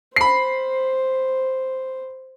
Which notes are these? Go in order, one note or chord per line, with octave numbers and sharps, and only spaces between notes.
C5 B5 C7